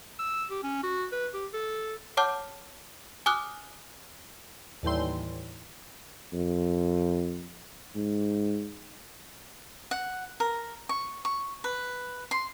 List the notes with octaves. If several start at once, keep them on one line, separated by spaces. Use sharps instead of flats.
E6
G4
C#4
F#4
B4
G4
A4
C#5 F#5 A5 D6 F6 G6
G#5 D6 D#6 F6 F#6
D#2 A2 E3 G3 C6
F2
G#2
F#5
A#4
C#6
C#6
B4
C6